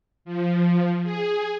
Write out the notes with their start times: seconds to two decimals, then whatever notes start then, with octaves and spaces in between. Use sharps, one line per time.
0.25 F3
1.03 G#4